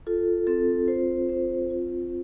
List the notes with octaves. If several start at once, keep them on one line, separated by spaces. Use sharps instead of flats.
F4 A4
C4 A4
F4 C5
C4 C5
F4